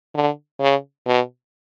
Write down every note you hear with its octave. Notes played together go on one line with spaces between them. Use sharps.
D3
C#3
B2